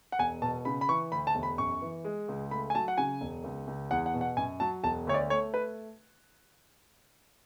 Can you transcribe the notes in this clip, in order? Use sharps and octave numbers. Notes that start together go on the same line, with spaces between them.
F#5
E1 G#5
B2 A5
C#3 B5
B5
E3 C#6
D2 B5
A5
E1
B5
F#2 C#6
E3
G#3
C#2
A3 B5
G#5
F#3 A5
F#5
C#3 G#5
E1
C#2
C#2
E2 F#5
F#5
B2
F#5
F#2 G#5
F#3 A5
E1 A5
D2 C#5
D5
A3 C#5
B4